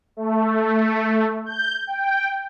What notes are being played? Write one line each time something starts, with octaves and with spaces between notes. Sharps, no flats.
A3
G6
G5